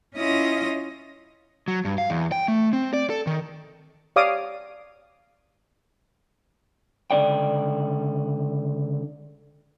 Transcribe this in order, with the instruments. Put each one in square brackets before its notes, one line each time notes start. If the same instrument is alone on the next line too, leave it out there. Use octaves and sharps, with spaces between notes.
[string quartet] C#4 E4 F4 D#5 D#6 A#6
[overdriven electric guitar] F#3
G2
F5
E2
G5
A3
C4
D5
A4
D#3
[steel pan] G4 C#5 D5 F5 D6 D#6
[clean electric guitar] C#2 D3 D5 G5